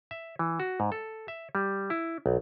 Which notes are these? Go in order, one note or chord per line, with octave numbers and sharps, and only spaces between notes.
E5
E3
F#4
G#2
A4
E5
G3
E4
B1